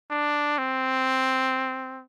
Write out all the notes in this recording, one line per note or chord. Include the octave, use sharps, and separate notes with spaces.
D4
C4